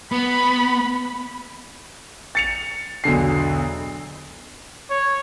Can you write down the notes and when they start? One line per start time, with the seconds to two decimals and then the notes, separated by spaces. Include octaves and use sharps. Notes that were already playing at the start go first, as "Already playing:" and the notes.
0.12 B3 B5
2.35 A6 C#7 F7
3.04 B1 E2 D3 C7
4.90 C#5